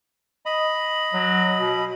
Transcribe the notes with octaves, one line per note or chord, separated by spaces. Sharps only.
D#5 B5
F#3
B2